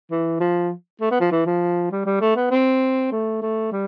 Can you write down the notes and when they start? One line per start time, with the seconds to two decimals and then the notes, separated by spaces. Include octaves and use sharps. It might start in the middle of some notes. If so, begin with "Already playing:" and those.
0.11 E3
0.40 F3
1.01 A3
1.11 B3
1.20 F3
1.31 E3
1.46 F3
1.91 G3
2.05 G3
2.21 A3
2.36 B3
2.51 C4
3.12 A3
3.42 A3
3.72 G3